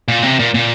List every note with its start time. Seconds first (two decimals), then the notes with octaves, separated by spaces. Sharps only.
0.08 A#2
0.23 C3
0.39 A#2
0.54 A#2